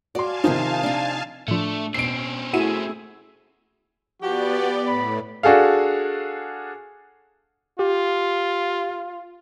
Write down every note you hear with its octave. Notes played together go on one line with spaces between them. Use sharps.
F#4 D5 F5 G#5 A5 C6
C3 D#3 F3 D#4 F4 C5
C4 D4
A2 F3 A3 D4
B2 C4 C#4 C7 D7
A3 E4 F#4 G#4 D#7 E7
F3 B3 F#4 G4 D5
A2 B5
D4 F#4 G#4 A4 F5
F4 G4